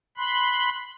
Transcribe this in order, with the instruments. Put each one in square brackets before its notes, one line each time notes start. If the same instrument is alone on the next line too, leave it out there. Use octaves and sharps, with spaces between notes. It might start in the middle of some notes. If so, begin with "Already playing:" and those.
[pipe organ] B5 C6 F#6